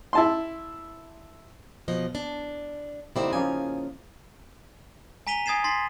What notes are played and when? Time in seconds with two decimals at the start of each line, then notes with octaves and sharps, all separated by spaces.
0.13 E4 A5 C6
1.88 B2 F3 D#5
2.15 D4
3.16 D3 G3 A#3 C4 D#4 E4
3.33 C#3 F3 A#3 G#5
5.27 G#5 A#5 B6 D#7 F7 G7
5.46 G#5 D#6 G#6 A6 C7 E7
5.64 C6 A6 B6 C7